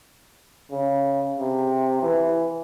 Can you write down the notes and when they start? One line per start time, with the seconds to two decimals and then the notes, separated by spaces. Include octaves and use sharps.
0.71 C#3
1.39 C3
2.02 E3